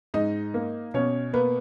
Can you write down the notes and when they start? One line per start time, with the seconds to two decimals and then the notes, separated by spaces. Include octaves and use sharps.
0.14 G#2 D#4 D#5
0.54 A#3
0.94 B2 C#4 C#5
1.33 A#3 B3 B4